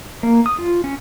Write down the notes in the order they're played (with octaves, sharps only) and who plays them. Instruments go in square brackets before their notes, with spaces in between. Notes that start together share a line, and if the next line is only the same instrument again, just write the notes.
[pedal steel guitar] A#3
D#6
F4
C#4